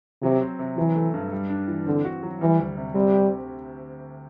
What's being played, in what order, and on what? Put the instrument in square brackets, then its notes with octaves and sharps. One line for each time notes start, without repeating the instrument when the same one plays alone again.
[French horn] C3 [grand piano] F#3
[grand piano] C4
C3
[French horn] E3 [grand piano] F#3
[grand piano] A3
G2
G3
D4
E3
[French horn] D3 [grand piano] C4
[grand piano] F#4
F#3
[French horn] E3 [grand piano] G3
[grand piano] D2
C3
[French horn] G3 [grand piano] C4
[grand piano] G4